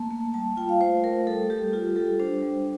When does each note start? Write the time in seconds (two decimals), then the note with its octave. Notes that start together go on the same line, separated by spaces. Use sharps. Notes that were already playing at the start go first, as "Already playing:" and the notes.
Already playing: A3 A#3 A5
0.11 A#3
0.34 G3 A5
0.57 F4 G5
0.69 F5
0.81 A3 C5
1.04 A3 A#4
1.27 G3 A4
1.50 G3 G4
1.73 F4 G4
1.96 G3 A4
2.20 D4 C5
2.42 G3